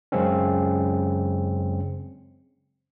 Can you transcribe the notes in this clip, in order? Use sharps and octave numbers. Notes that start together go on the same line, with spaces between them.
F#2 C#3 G#3 C4 C#4